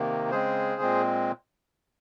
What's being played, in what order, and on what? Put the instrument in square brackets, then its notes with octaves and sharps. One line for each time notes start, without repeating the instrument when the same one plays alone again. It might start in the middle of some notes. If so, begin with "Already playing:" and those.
Already playing: [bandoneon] C3 D#3 A#3
C#3 G#3 C4 G#4 C5
A#2 G#3 C4